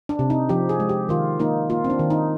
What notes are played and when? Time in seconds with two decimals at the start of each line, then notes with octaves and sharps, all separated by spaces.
0.09 D4
0.19 C3
0.30 D#4
0.49 F3 G4
0.69 G#4
0.80 G#3
0.89 G4
1.09 D#3 F4
1.40 A#3 D#4
1.69 A#3 F4
1.84 C4
1.90 D4
1.99 D#3
2.10 D#4